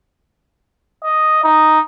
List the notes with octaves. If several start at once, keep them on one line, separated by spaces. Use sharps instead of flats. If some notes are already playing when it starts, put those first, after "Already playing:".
D#5
D#4